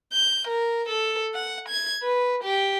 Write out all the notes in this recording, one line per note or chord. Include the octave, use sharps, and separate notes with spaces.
G6
A#4
A4
F#5
G#6
B4
G4